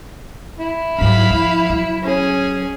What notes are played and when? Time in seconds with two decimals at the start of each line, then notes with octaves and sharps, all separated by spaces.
0.59 E4
0.99 G#2 F#3 F5 B5
1.30 F3
1.70 F#3
2.03 C#4 G#4